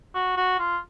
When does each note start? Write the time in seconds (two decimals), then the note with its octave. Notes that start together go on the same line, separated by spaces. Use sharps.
0.14 F#4
0.37 F#4
0.59 F4